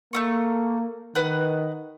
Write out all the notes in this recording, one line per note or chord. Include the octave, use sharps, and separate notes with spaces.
A3 A#3 E4 C#6
D#3 B4 D#5 F#5